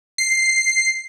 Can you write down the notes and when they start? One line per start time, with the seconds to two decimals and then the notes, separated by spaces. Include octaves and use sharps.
0.18 C7